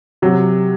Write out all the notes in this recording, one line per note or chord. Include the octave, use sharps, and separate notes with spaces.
C3 F#3